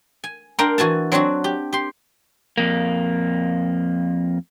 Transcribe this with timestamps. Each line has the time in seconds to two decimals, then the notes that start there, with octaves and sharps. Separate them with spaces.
0.24 G#5
0.59 D4 A#4 F5 G5 A#5 C6
0.78 E3 F#4 G#5 A5
1.12 F#3 C4 D4 F#4
1.44 G4
1.73 G4 C6
2.57 F2 A#3